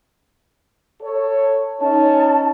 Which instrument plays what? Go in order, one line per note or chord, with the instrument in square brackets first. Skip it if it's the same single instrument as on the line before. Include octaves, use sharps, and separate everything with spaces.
[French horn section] A4 C#5
[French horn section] C#4 D#4 [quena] A5